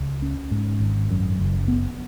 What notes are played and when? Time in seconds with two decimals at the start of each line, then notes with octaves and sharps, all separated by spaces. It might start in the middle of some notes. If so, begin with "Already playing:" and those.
Already playing: C#2
0.22 C#4
0.51 G#2
0.80 G#1
1.11 F#2
1.39 F#1
1.68 B3